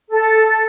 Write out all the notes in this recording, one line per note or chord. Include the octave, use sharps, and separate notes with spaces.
A4